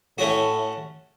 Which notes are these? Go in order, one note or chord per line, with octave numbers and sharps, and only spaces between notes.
A2 A3 C#4 F#4